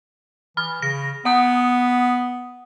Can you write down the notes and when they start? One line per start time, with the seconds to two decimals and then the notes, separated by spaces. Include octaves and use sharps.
0.57 E3 B5 F6
0.82 C#3 A#6
1.25 B3 F#5 D#6